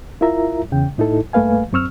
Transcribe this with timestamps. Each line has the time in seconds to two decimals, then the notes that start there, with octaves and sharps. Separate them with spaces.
0.21 E4 F4 A#4 E5 A#5
0.72 E2 C#3 G5
0.98 A2 D#4 E4 A4
1.33 G2 A3 A#3 B4 F5 G#5
1.73 F#2 C4 C#6 E6 F6